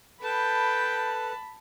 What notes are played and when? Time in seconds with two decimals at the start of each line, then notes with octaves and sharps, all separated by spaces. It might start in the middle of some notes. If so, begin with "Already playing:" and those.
0.22 A4 B4 G5 A5 B5